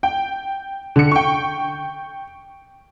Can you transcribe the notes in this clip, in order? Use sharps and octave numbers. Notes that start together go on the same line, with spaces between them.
G5
D3 C#7
G5 C#6